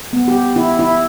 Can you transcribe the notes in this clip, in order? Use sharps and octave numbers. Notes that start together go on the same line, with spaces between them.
B3
G4
E4
E4